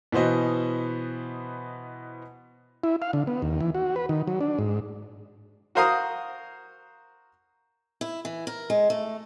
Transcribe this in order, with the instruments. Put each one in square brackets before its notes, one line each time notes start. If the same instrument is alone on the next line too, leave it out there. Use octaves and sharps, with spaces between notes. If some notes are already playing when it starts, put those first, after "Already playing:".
[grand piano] B2 E3 B3 C5 D#5
[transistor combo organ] E4
F5
D3
B3
D#2
E3
F#4
B4
D#3
F#3
D4
G#2
[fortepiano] F#4 A#4 C5 F5 A#5 D#6
[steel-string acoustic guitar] E4
E3
A#4
G#3
A3